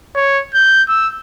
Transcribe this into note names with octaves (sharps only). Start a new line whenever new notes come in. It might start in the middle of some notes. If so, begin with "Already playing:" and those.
C#5
G6
E6